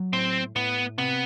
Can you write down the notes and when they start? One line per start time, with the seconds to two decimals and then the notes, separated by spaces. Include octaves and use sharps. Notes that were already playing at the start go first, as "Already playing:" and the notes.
Already playing: F#3
0.13 A2 C4
0.55 A2 B3
0.98 C3 B3